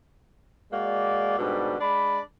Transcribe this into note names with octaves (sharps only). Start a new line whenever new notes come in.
G#3 A#3 F#4 D5
G#2 B2 D3 G3 D4
G#3 D4 D5 B5